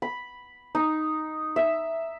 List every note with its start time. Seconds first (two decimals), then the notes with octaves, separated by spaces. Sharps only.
0.02 B5
0.75 D#4
1.56 E5